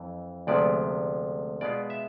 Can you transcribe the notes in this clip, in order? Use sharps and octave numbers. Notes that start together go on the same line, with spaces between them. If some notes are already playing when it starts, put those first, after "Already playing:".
Already playing: F2 E3
D2 C3 F3 G#3 B3 D5
B2 G#3 B3 F4 D5
E5